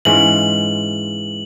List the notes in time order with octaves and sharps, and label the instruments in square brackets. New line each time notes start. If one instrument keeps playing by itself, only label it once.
[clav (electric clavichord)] G#2 E3 G#3 C#4 F4 [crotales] F#7